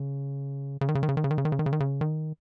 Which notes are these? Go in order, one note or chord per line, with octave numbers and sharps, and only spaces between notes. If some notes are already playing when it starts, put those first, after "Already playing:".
Already playing: C#3
C#3
D#3
C#3
D#3
C#3
D#3
C#3
D#3
C#3
D#3
C#3
D#3
C#3
D#3
C#3
D#3